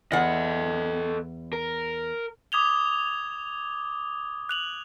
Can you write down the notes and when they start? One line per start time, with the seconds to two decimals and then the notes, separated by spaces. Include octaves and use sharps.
0.12 E2 A4 D#5 F#5
1.53 A#4
2.52 D6 D#6 G#6 F7 G7
4.49 F#6 F7 F#7